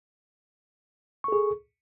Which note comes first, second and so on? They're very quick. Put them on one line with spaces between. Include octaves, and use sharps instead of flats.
C#6 A4 G#4